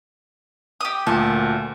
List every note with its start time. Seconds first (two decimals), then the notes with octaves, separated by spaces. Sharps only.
0.81 G4 D#6
1.07 D2 A#2 A5